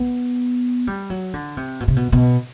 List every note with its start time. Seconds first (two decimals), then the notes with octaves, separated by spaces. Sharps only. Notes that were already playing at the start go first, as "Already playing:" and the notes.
Already playing: B3
0.87 G3
1.10 F#3
1.34 D3
1.57 C3
1.80 B2
1.88 C3
1.96 B2
2.12 B2